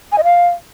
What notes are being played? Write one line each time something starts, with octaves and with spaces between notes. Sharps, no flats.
G#5
D#5
F5